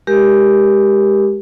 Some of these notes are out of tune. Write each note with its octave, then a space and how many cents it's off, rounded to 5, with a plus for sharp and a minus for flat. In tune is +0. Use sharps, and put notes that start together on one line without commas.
G#3 +0 G4 +0 A#4 +15